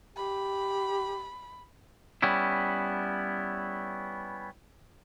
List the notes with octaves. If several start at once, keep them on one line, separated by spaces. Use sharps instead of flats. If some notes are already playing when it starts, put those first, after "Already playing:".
G4 B5
G3 B3 C#4 E4